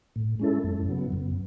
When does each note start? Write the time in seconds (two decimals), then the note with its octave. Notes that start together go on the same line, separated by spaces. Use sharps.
0.16 A2
0.40 G#3 C#4 E4 A4
0.64 F#2
0.89 C#3 F#3 B3
1.12 F#2